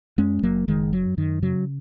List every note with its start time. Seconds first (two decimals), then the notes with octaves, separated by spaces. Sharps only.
0.18 F#2 G#3 C#4
0.43 F#1 F#3 A#3
0.68 F#1 D#3 G#3
0.92 F#2 F#3
1.17 F#2 D#3
1.42 C#3 F#3